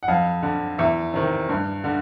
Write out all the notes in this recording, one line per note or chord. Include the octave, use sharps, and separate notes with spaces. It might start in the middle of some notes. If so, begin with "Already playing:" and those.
F#5
F2 F5
D3
E2 E5
C3 D#3
G2
D3